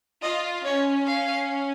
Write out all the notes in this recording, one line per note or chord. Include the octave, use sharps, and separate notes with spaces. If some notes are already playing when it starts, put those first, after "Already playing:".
F4 D#5
C#4 C#5
F5